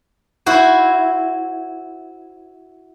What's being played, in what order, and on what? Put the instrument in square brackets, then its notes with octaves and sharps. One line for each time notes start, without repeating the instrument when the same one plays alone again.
[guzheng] E4 F#4 C5